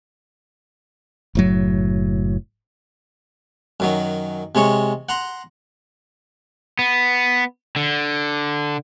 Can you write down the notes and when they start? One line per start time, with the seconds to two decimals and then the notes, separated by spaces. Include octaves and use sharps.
1.35 F#1 A2 F#3
3.80 F#2 D#3 F#3
4.55 C3 G#3 C#5 C#6
5.09 F#5 A#5 C6
6.79 B3
7.76 D3